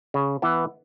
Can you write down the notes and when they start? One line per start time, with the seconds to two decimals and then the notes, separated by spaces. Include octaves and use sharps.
0.14 C#3
0.42 E3 B3